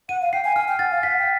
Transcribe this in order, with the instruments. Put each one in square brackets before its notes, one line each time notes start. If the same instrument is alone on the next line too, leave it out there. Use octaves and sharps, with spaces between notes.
[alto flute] F#5 [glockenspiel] D#7
[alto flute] F5
[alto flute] G5 [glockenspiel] C7
[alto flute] G#5
[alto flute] G#5 [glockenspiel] F6
[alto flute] G5
[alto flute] F#5 [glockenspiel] A6
[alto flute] F5
[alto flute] F#5 [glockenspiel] B6
[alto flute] G5